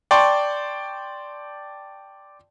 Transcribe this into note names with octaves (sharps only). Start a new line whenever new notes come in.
D5 G5 A5 C6 C#6